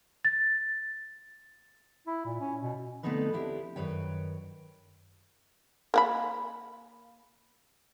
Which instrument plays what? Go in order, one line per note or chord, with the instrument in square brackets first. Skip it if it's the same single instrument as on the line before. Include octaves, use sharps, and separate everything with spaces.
[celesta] A6
[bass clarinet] E4
A#2
C#4
B2
[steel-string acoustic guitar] D3 A3 B3 C4 D#4 B4
D2 D4 E4 G4
F#2 D#3 B4 C#5 G5
[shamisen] A#3 F#5 B5